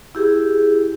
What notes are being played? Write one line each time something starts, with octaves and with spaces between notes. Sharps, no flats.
E4 G4 G#4